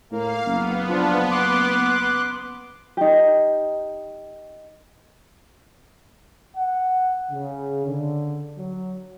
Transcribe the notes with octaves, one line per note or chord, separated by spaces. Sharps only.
A2 A#3 F5
F#1 B3
F3 D4 F4
C6 D6 F#6
D#4 G4
F#5
C#3
D3
F#3